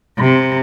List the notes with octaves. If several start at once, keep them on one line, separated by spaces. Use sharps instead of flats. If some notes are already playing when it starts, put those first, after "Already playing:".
C3